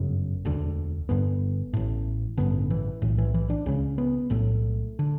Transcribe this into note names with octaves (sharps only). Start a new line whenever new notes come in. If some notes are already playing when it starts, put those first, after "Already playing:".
Already playing: G1 F#2 C#3
E1 D2 D3
G1 G2 D3 B3
A1 A2
A1 G2 D3 B3
E3
B1 A2
E3
E3
D4
C#2 C#3 C#4
B3
B1 A2 A3
D3